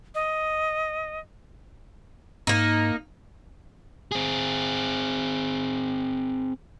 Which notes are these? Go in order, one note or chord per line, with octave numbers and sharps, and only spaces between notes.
D#5
G#2 A#3 D#4
C4 G#4